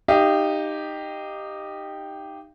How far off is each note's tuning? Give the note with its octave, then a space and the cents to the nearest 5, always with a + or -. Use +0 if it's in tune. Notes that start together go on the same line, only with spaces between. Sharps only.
D#4 -15 G4 +0 F5 -35